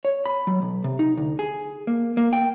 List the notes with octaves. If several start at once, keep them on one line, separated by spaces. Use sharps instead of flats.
C#5
B5
F#3
B1
C3
D#4
D2
G#4
A#3
A#3
G5